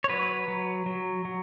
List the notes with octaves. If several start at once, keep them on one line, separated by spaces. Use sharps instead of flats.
C#5
F#3 B4
F#3
F#3
F#3